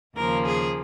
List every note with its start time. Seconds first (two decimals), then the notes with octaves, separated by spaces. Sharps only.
0.17 D#2 C#3 F3 A#3 A#4
0.45 G#4